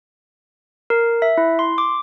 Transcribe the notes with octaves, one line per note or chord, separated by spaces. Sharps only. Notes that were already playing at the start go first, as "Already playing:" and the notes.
A#4
E5
E4
C6
D6